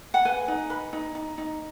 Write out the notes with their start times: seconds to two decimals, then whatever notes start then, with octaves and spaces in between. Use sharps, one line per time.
0.14 F#5
0.25 B4 G#5
0.48 D#4
0.70 B4
0.93 D#4
1.15 D#4
1.38 D#4